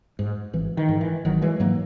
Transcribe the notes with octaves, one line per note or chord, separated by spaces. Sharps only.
G#2
G#1 E3
D#3
G#2
E3
G#1 D#3 F#3
E3 G#3
G#2 F#3 A#3